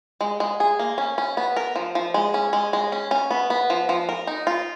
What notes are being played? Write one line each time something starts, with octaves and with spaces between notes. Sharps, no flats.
G#3
G#3
G#4
A#3
C#4
C#4
B3
A#4
F3
F3
G#3
C#4
G#3
G#3
C#4
C#4
B3
B3
F3
F3
A#4
D#4
F4